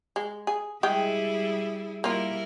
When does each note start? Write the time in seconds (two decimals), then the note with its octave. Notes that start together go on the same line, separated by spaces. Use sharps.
0.16 G#3
0.47 G#4
0.83 G3 G#3 E4 G#4 G5
2.04 G3 A#3 E4 F4 A#4